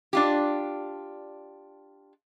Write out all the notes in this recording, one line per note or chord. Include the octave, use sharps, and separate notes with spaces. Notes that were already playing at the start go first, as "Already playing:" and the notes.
D4 F4 G4